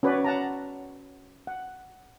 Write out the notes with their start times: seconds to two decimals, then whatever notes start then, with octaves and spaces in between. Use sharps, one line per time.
0.03 C#4 F#4 B4 C#5 D5
0.24 F#5 A5 A#5
1.47 F#5